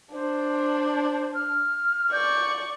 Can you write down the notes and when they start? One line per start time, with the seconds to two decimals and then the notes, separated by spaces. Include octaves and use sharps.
0.13 D4 C5
1.34 F6
2.12 D5 C#6 G6